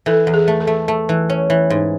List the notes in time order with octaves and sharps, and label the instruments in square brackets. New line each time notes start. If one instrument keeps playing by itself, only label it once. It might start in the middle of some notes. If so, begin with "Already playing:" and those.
[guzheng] E3 [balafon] A4
[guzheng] E2
[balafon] G#4
[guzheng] A3
[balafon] A4
[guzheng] A3
A3
E3
C#4
E3
G#2